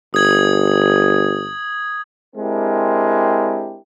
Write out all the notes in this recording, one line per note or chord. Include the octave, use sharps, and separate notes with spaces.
G1 D#6 G#6 F#7
G#3 C4 D4 E4 G4 A#4